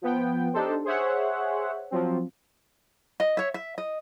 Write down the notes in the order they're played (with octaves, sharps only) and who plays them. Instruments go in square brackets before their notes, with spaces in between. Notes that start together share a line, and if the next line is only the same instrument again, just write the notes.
[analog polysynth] F3 B3 G5
D4 D#4 G4 A4 C5
G#4 C5 C#5 E5 F#5
F3 F#3 C4
[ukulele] D#5
C#5 E5
E5
D#5